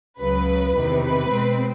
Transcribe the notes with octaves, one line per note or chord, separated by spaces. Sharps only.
C#2 C#3 F#3 B4
E2 C3 D#3
B4
B2 G#3 C4